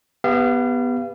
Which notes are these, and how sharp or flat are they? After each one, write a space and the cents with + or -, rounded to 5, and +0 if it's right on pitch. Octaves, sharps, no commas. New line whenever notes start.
B3 +0 G4 +25 F5 -35